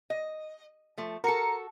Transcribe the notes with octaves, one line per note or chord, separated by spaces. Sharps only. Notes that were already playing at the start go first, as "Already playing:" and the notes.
D#5
F3 A3
F#4 A4 A#4 A#5 C#7